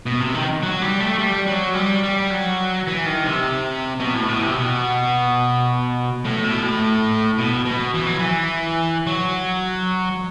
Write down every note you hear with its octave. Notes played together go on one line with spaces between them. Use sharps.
B2
C3
D#3
F#3
G3
A3
G3
F#3
G3
G3
F#3
E3
D#3
C3
B2
A2
B2
C3
B2
A2
B2
A2
B2
B2
E3
F#3
E3
F#3